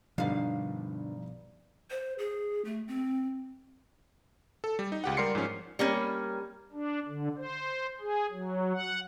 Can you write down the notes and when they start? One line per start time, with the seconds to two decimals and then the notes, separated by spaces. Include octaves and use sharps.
0.18 G2 B2 D3 F3 D4 D#4 F5
1.90 C5
2.18 G#4
2.65 A3
2.88 C4
4.64 A4
4.79 G3
4.92 D#4
5.04 C#2 G4 F#5
5.17 G3 A#4 D5 C6 C7 C#7
5.35 G#2 F3 C#4
5.79 G3 A#3 C#4
6.73 D4
7.08 D3
7.37 C5
8.00 G#4
8.31 F#3
8.74 F#5